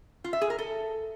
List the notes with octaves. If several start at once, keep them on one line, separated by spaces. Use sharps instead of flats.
F4
E5
G#4
A#4
A4